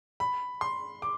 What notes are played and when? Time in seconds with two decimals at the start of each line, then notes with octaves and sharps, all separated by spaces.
0.20 B5
0.61 C6
1.02 D6